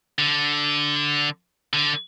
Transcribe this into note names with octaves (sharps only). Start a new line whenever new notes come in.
D3
D3